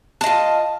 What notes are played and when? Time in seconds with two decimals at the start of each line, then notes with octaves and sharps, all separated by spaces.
0.21 A5
0.24 D#5
0.26 F4